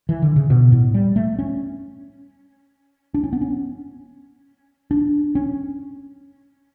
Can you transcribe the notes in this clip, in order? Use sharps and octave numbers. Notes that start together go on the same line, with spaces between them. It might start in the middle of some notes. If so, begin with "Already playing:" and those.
E3
D3
C#3
B2
A2
G3
A3
C#4
D4
C#4
B3
C#4
D4
C#4